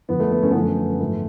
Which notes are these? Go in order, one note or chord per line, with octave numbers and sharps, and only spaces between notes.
F2 D3 F3 B3
A3
B3
A3 C#4
B3
F#2 D3 F3 A3 C#4
B3
G#2 F3 A3